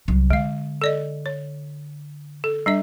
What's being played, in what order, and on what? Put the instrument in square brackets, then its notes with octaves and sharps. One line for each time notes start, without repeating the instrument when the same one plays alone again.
[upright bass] C2 F#3
[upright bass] D3 [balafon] G#3 F5
[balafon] A4 D5 D#5
C#5
A4
G3 D4 E5